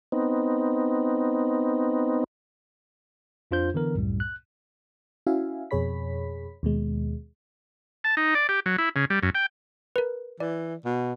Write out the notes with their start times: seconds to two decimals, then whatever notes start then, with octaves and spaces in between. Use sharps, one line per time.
0.12 B3 C4 D#4
3.51 F2 D4 F4 C5 G6
3.74 D3 E3 B3 A#4
3.95 C2 F#2 A2 G3
4.20 F#6
5.27 C#4 E4 F#4 E5 F5 G#5
5.71 F2 B2 G#4 C#5 B5 B6
6.63 D#2 B2 G#3
8.04 A5
8.17 D#4
8.35 D5
8.49 G4
8.66 F#3
8.78 E4
8.96 C#3
9.10 G3
9.23 F#2
9.35 G5
9.96 A#4 B4
10.40 E3 D5
10.85 B2